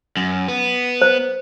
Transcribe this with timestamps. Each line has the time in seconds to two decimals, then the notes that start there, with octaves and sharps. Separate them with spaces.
0.17 F#2
0.48 B3
1.02 C5